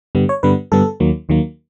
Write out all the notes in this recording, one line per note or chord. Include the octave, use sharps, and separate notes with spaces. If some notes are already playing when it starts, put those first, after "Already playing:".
G2 D3 G3 B3
C#5
G2 D3 G3 B3 B4
G2 D3 G3 B3 A4
D#2 D#3 F#3 A#3
D#2 D#3 F#3 A#3